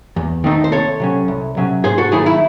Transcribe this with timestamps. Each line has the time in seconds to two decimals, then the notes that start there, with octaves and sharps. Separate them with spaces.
0.16 E2
0.44 D#3 A3 C4 D#4
0.64 C5
0.72 C2 A4 C#5
1.00 C3 F#3 C#4
1.28 C2
1.57 C3 F#3 C#4
1.84 G#2 G#4 C5
1.98 F#4 A4
2.12 D#3 F#3 A3 E4 G#4
2.26 E4